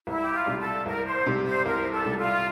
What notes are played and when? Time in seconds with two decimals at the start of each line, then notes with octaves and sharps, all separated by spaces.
0.07 C2 E4
0.22 G4
0.34 F4
0.46 C3 G3
0.59 A4
0.86 C2 A#4
1.06 C5
1.26 C3 G3
1.46 C5
1.65 C2 A#4
1.91 A4
2.05 C3 G3
2.18 F4